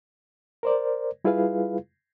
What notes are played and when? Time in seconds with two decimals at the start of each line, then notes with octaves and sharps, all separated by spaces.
0.63 A#4 C5 D5
1.24 G3 E4 F4 G#4 B4 F5